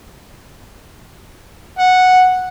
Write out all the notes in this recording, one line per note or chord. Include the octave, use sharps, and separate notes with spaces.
F#5